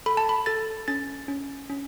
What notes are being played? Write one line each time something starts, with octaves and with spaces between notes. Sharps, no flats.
A4 B5
A5
B5
A4 A6
C#4 A6
C#4
C#4